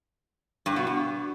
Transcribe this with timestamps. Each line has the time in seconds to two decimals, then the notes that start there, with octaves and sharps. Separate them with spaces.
0.66 G2
0.76 B2
0.87 G2